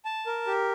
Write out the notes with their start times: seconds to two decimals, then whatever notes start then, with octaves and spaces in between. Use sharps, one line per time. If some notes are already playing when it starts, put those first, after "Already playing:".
0.05 A5
0.26 A#4
0.47 G4